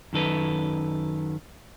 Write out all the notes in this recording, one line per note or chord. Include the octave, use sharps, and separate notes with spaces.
F#2 D#3 A4 B4